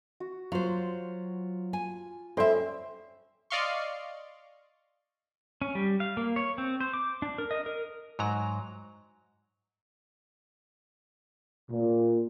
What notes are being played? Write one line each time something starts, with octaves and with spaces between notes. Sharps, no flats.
F#4
F#3 F4 C5
G#5
C#4 F4 A4 C5 D5 E5 G5 C6
D5 D#5 F5 C6 C#6
C#4
G3
F5
A#3
C#5
C4
C5
D6
D4
A#4
D#5
A#4
G#2 F#3 A#5
A#2